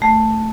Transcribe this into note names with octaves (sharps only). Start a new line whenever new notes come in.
A3